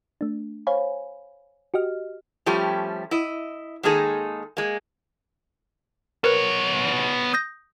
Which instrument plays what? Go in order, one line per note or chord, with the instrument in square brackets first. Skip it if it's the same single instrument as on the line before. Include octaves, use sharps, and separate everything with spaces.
[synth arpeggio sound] A3 D4
C5 C#5 F5 G#5 B5
F#4 G4 D#5 F6
[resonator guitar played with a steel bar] F3 G3 A3 C#4 G4
E4 D#5
D#3 G#3 A#3 D#4 G#4 A4
G#3 A#3
[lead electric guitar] B3 C#5 [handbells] A#4 B4
[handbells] D#6 G6 A#6